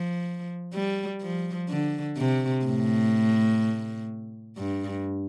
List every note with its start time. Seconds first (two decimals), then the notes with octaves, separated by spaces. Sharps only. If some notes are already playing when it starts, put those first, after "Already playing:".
Already playing: F3
0.73 G3
1.22 F3
1.69 D3
2.17 C3
2.65 A2
4.57 G2